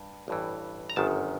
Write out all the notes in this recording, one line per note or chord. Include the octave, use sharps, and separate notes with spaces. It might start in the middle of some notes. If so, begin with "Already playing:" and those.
Already playing: G2
A1 G2 E3
A#5
G1 F#2 D#3 A5